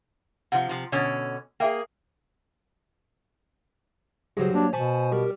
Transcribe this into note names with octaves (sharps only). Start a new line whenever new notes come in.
C3 F3 F#5
C3 F3
B2 D3 C#4
A#3 G#4 E5 G5
G2 C#3 F#3 G#4 C5
A#3 D4 C#5
B2 C5 G#5 A5 B5 C#6
G3 G4 A#4